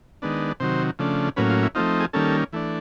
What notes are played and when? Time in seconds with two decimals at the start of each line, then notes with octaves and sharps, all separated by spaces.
0.22 D#3 G#3 B3 D4
0.60 C3 D#3 F#3 C5
0.99 C#3 F3 A3 D4
1.36 A2 F#3 A#3 C#4 B4
1.50 F4
1.63 E4
1.75 F3 A3 C4 D#4 F4
2.00 G#4
2.13 D#3 G3 A#3 C#4 A4
2.53 E3 A3 D4